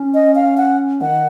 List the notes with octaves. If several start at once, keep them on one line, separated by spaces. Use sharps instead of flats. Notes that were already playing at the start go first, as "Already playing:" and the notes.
Already playing: C#4
D#5
F5
F#5
D#3 F#5